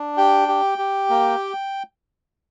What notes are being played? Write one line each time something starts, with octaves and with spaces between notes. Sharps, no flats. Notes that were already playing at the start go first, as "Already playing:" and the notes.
Already playing: D4
G4 G5
G4
G4
A#3